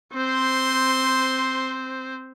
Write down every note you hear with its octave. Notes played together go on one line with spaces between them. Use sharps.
C4 C5 C6